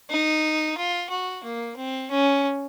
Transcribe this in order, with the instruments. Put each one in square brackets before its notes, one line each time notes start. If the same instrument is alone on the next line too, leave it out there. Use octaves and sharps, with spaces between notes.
[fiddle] D#4
F4
F#4
A#3
C4
C#4